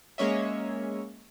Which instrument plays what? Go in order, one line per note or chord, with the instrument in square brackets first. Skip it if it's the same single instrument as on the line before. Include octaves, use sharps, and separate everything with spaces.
[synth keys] G#3 A#3 C#4 C#5 D#5 E5